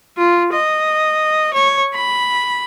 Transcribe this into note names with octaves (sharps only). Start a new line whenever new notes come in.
F4
D#5
C#5
B5